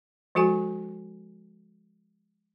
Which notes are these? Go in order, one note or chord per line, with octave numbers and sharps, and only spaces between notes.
F3 G#3 F#4 A4 G#5